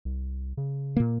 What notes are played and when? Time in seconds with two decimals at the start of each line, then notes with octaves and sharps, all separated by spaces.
0.05 C2
0.57 C#3
0.96 A#2 A#3